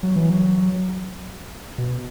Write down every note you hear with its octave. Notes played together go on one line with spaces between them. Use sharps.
F#3
E3
F#3
B2